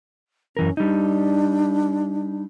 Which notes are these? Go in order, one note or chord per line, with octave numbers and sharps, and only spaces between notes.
F#2 E3 C#4 A#4
G3 D4 D#4